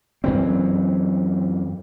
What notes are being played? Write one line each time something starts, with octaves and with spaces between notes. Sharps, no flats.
F#2 E3 C4